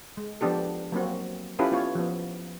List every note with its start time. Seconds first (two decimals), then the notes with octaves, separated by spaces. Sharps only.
0.17 G#3
0.41 F3 B3 D4 G4 A4
0.92 F#3 A#3 C4 F#4
1.59 C#4 E4 F4 G4 A4 B4
1.72 B3 F4 C#5
1.95 F3 B3